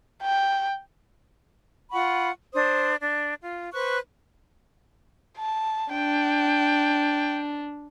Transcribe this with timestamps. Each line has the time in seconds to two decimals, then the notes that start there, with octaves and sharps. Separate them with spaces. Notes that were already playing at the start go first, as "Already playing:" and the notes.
0.22 G5
1.91 F4 F#5 B5 C#6
2.53 D4 C5 D#6
3.00 D4
3.41 F4
3.72 B4 C5 C#6 F#6
5.38 A5
5.94 D4 G5